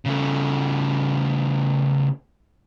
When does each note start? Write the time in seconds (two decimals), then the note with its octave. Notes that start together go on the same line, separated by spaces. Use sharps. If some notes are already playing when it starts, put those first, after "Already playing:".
0.06 C#3 A3